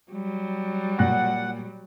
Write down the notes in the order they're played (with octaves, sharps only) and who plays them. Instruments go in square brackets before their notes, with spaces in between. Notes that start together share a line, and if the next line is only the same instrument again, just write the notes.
[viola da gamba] F#3 G3
[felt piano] A#2 F#6 A#6 [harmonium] F#5